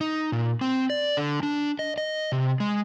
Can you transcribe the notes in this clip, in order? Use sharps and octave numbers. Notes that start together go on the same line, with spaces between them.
D#4
A#2
C4
D5
D3
D4
D#5
D#5
C3
G#3